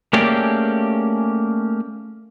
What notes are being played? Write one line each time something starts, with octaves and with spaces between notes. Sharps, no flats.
A3 A#3 C#4 G4 G#4 D5